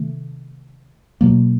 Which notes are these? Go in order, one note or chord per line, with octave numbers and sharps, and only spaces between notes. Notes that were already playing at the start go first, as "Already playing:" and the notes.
Already playing: C3 D#3 A3
B2 F#3 A#3